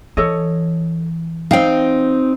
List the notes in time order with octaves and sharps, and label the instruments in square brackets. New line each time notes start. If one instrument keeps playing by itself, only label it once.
[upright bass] E3 [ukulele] A4 C#5 D#5
[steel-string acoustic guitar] C4 D#4 [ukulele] F5 G5